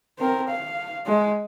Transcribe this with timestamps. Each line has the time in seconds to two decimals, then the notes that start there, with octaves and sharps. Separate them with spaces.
0.19 C4 A#4
0.48 F5
1.06 G#3